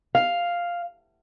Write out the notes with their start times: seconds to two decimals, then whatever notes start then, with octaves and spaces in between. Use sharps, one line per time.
0.15 F5